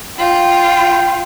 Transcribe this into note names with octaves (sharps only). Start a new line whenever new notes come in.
F4 G5